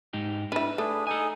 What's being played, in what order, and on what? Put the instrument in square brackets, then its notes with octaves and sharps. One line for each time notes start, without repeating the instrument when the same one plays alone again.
[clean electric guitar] G#2 D#4 G4
[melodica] G3 [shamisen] D4 E4 [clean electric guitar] B4
[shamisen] A3 [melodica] D4 G#4
[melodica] D#4 G#4 [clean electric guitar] A4 G#5